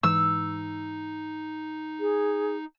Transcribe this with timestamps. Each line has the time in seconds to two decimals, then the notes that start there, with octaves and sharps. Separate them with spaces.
0.03 G#2 E3 G#3 D#4 E6
2.00 G#4